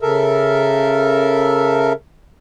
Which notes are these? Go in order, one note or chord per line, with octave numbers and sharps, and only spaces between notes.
C#3 A4 A#4 E5